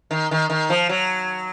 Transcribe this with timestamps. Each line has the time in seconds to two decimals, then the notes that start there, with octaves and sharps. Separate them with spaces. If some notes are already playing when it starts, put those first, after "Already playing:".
0.11 D#3
0.31 D#3
0.50 D#3
0.70 F3
0.89 F#3